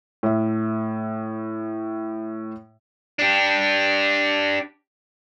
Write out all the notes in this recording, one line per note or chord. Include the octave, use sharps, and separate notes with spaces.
A2 E5
D4 G4